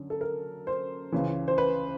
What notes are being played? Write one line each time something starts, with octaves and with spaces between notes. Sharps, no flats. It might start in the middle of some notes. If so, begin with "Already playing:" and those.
Already playing: F#2 D3
A4
A#4
C5
C#2 C#3 E3
C5
B4